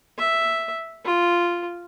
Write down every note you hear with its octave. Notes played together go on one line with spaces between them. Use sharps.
E5
F4